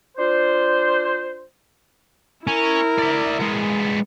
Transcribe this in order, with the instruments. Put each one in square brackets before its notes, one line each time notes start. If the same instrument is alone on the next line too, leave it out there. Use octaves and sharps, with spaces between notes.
[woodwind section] D4 F4 C5
[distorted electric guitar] C#4 [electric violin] E4 A#4
[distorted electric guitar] D5 E5
G#3 B3